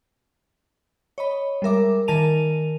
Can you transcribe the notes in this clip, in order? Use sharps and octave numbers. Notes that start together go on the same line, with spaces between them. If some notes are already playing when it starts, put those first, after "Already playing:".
C#5 D#5 B5
G3 G#3 A#4 E5 D6
D#3 A#4 G#5 A5 D#7 F7